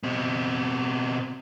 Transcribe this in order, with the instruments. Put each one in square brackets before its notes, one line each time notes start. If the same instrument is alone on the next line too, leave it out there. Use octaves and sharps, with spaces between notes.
[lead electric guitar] B2 C4